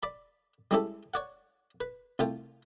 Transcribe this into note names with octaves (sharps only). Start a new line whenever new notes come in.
D5 B5
G3 G#3 C#4 E4 G4 A4
C#5 D5 F#5
B4
C2 A3 F4 G5